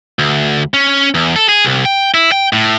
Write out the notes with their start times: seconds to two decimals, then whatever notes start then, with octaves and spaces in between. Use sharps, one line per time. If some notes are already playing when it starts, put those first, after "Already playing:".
0.19 D2
0.74 C#4
1.15 E2
1.36 A4
1.49 G#4
1.65 C2
1.85 G5
2.14 E4
2.32 G5
2.53 A2